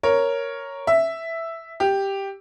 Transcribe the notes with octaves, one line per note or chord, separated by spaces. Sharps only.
A#4 C#5
E5
G4